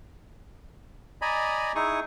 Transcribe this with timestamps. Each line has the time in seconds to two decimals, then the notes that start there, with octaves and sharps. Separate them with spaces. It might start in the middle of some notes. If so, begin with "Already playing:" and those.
1.22 D5 D#5 G#5 A#5 B5
1.75 D#4 E4 G#4 C#6 D#6